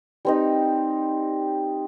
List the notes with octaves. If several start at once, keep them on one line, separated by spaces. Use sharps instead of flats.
G3 C4 D#4